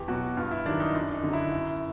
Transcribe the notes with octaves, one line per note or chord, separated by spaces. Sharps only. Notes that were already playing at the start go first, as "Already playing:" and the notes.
Already playing: E2 G4
B2 F#3 F#4
G2 F4
E4
D#3 F#3 D4
D#4
F#2 D4
D#4
D3 F#3
E4
F#2